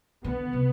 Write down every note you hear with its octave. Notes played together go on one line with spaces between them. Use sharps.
D3 B3
C3